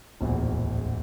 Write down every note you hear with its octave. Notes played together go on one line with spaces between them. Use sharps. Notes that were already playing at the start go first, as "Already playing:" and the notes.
D1 A#1 E2